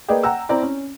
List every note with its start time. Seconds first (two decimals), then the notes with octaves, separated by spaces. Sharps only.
0.09 A#3 G#4 B4 D5 D#5 G5
0.23 F#5 G5 A#5 E6
0.49 C4 E4 D5 A#5
0.63 C#4